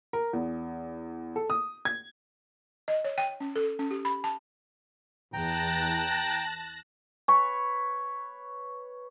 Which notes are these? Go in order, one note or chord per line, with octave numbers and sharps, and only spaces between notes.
A#4
E2
A4
D#6
G#6
D#5
C#5
G5
C#4
A4
C#4
G4
B5
A5
E2 G5 A5 A#5 F#6 A#6
B4 C#5 C#6